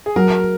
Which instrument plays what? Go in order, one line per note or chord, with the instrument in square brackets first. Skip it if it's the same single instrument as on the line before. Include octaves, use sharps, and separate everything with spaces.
[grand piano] G#4
[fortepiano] F#3 [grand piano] A#4